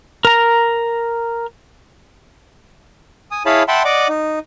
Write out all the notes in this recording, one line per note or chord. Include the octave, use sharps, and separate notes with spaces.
A#4 A#5
G#5 D#6
E4 G#4 C#5 F5 A5 B5
E5 F#5 G5 A5 B5 C6
D5 D#5 F#5 D6
D#4